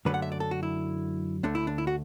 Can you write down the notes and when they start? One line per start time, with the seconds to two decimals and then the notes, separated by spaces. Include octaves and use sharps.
0.05 F#2 D3 F#3 A3 B4
0.14 F#5
0.22 E5
0.32 D5
0.40 A4
0.51 F#4
0.63 E4
1.43 D2 D3 A3 D4
1.55 E4
1.67 D4
1.78 E4
1.87 F#4